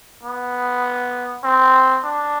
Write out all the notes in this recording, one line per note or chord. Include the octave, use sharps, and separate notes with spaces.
B3
C4
D4